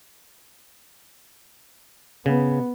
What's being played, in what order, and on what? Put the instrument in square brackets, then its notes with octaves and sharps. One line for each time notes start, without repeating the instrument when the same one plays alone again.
[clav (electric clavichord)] C#3 [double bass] B3